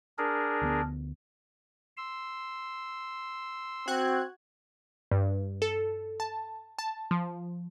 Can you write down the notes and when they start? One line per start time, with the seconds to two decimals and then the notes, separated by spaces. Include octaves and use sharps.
0.18 D4 G#4 A#4
0.62 D2 A#3 B3
1.97 C6 E6
3.88 C4 F#4 F#6 G#6
5.12 G2
5.62 A4
6.20 A5
6.79 A5
7.11 F3